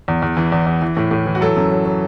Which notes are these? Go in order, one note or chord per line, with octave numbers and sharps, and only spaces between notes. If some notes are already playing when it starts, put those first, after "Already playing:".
E2
E2
E3
E2
E2
E3
A2
A2
E3
F#4
F#3 A4
F#2
F#3
F#3